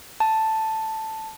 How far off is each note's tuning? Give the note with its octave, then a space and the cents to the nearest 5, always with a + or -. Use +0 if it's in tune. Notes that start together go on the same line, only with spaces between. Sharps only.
A5 +5